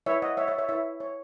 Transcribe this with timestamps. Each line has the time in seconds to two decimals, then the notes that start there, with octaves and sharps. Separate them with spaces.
0.06 E4 B4 C#5 E5
0.22 D#5 F#5
0.37 C#5 E5
0.48 C#5 E5
0.58 C#5 E5
0.69 E4 B4 C#5 E5
1.00 C#5